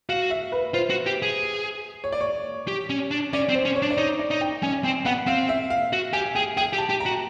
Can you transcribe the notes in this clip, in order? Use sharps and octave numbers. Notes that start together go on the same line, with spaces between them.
F#4 F5
E5
B4
F4 C5
F#4
G4
G#4
C#5
D5
C#5
G4
C#4
D4
C#4 D5
C4
C5
C#4
C#5
D4
D5
D#4 C#5
D5
D#4
G5
C#4 G#5
C4 G5
B3 F#5
C4 F5
E5
F5
F#4
G4 G#5
G#4 G5
G#4 G5
G4
A5
G4
A#5
F#4
A5